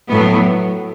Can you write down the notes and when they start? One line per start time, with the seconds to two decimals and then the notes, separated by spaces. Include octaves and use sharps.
0.09 A2 F#3 B3